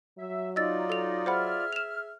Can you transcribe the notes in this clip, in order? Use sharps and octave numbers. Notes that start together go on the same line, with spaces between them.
F#3 E5
D#4 F4 D5 D#5 E6 A6
A4 F7
G#4 C5 E5 F#5 B5 F6
E7 F7